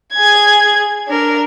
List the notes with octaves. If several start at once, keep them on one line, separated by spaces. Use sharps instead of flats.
G#4 G#6
D4 A#4